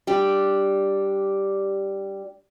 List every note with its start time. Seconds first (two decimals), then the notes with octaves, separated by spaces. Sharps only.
0.07 G3 D4 G4